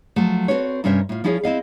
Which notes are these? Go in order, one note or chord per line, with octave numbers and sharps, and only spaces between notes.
F3 F#3 A3
C4 F#4 A4 B4 C#5
G2 C3 C#4 A#4 C5 E5
A2 F4
F3 C#4 E4 G#4 B4 C#5
C4 E4 D#5 F5